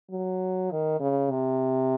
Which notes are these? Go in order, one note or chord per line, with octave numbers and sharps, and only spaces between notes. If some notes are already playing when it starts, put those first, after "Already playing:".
F#3
D#3
C#3
C3